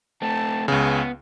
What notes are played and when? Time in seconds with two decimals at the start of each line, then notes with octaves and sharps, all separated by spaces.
0.22 A3 C4 A5
0.68 C#2 C#3 B3 G#5